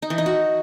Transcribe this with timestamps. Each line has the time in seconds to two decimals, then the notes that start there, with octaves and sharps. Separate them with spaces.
0.02 D#4
0.10 E3
0.18 D#4
0.26 F#4